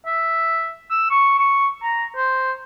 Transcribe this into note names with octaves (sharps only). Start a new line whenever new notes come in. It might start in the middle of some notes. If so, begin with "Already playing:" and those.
E5
E6
C#6
C#6
A#5
C5